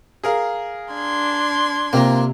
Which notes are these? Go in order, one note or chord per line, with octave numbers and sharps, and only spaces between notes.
G#4 A#4 F5
D4 C6 G#6
C3 A#3 C4 F4 A#5